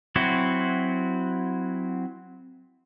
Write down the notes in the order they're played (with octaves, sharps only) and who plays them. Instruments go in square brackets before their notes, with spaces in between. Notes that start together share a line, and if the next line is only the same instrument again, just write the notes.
[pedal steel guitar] F#3 C4 E4 F#4